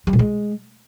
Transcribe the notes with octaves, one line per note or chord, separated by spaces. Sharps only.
G3
A#2
G#3